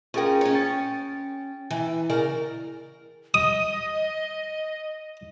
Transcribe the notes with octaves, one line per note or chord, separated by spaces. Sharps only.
C#4 F4 G#4 A#4 G5
C#4 C#5
G5 A6
E3
C#3 A#4 D5
D#5 D#6